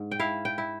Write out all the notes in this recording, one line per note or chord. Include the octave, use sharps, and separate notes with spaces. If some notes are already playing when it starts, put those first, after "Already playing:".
Already playing: G#2
G5
E4 F5
G5
E4